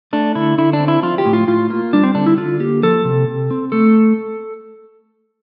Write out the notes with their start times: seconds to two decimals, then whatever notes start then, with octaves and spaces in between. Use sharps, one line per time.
0.13 A3 D4
0.35 D3 E4
0.58 D3 E4
0.73 D4
0.80 C4
0.88 E4
1.03 F3 F4
1.18 G4
1.26 A2
1.33 F4
1.48 A2 F4
1.70 A#3 F4
1.93 G3 D4
2.03 C4
2.15 D3 D4
2.26 E4
2.37 D3 F4
2.60 A#3 G4
2.83 F3 A4
3.05 C3
3.28 C3
3.51 C4
3.72 A3 A4